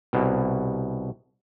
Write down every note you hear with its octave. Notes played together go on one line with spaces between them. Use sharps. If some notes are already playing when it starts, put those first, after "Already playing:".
C2 B2